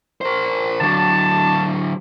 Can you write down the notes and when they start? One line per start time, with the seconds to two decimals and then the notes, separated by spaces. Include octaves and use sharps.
0.21 A#4 C5
0.80 D3 F#3 D4 F#4 A5